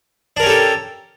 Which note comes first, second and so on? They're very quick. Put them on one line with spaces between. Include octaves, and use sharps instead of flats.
D4 A#4 C#4 G4 A4